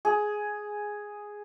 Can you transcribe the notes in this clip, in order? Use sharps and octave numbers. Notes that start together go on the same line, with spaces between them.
G#4